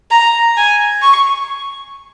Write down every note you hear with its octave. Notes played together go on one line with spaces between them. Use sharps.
A#5
G#5
C#6